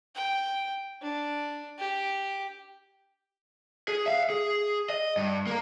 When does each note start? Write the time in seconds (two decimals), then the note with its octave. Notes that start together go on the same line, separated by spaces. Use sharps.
0.15 G5
1.02 D4
1.78 G4
3.88 G#4
4.06 E5 F5
4.30 G#4
4.90 D#5
5.17 G2
5.47 A#3 A#4